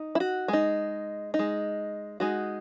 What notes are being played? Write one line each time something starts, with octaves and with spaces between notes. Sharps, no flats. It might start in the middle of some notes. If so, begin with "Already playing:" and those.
Already playing: D#4
E4
F#4
G#3 D#4
D#4
G#3
G#3 D#4 F#4